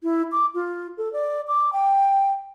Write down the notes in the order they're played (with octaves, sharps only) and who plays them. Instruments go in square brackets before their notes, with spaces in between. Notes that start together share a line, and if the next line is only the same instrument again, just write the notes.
[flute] E4
D6
F4
A4
D5
D6
G5